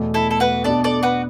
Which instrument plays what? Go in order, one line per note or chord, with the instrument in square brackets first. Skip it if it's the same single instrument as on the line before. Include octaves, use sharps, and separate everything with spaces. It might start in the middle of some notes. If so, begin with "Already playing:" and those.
Already playing: [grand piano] E2 B2 A3
[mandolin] E4 A4
A4
F#4 B4
[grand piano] B2 B3 D4 [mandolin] A4 D5
[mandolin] A4 D5
F#4 B4